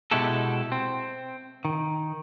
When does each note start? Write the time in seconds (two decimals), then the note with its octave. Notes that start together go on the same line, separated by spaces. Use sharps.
0.11 B2 G#3 E4 F#4 G4 A4
0.72 C4
1.65 D#3